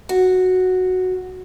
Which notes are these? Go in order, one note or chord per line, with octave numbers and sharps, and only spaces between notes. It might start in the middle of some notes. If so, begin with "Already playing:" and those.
F#4